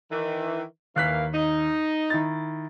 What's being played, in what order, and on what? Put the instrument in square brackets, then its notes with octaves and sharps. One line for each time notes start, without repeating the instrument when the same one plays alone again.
[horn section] D#3 E3
[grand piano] D#2 F#6 B6 [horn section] E3 A#3 F5
[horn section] D#4
[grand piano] D#3 E4 A6